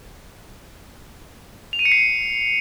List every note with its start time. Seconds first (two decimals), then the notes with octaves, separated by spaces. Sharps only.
1.73 F7
1.79 D#7
1.85 C#7
1.92 C7